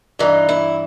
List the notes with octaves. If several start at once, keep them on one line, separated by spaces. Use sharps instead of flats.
G2 E3 D#4
E4